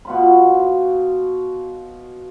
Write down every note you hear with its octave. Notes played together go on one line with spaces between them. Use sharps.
B2 F4 B5